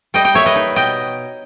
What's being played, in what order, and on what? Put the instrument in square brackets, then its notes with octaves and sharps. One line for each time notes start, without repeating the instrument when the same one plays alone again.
[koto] G3 D#5 G5
D#5 G5
A#3 C#5 E5
B4 D#5
D#4
B2 D#5 G5